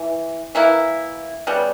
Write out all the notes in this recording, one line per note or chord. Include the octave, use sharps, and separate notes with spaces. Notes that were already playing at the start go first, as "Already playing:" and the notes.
Already playing: E3
E3 A#3 E4
C#3 G3 B3